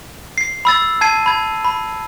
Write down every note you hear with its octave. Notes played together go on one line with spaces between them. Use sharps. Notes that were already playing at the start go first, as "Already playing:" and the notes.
C7
B5 E6 A6
A5 G#6 C7 D#7
B5 G#6
B5